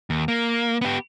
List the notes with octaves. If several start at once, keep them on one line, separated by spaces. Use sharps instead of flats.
D#2
A#3
B3 G4